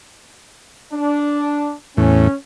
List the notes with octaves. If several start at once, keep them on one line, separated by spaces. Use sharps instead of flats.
D4
E2 A2 C#4